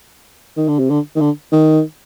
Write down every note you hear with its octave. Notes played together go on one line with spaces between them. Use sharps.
D#3
D3
C3
D3
D#3
D3
D#3